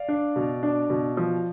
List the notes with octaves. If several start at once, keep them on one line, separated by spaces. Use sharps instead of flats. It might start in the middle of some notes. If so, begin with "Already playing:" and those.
Already playing: D5 F5
D4
B2
D4
B2
F3